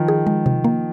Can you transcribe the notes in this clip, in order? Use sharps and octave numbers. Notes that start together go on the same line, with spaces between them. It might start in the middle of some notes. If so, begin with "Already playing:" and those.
Already playing: D#3 F3
G#4
G#3
C3
A#3